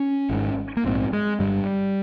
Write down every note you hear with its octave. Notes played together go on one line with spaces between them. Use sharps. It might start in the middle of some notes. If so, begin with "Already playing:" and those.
Already playing: C#4
G#1 G#2
A#3
A#1 G#2 C4
G#3
G1 G2 G3